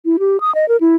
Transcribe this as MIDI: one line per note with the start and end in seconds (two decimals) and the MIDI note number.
0.05 0.17 64
0.19 0.40 67
0.40 0.53 87
0.55 0.65 75
0.69 0.77 70
0.81 0.96 64